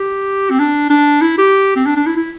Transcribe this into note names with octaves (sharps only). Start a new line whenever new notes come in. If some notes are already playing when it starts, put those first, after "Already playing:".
Already playing: G4
C4
D4
D4
E4
G4
C4
D4
D4
E4
E4